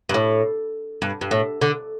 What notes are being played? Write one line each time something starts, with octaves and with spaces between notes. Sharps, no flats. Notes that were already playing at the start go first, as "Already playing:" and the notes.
G2
A2
G2
G2
A2
D3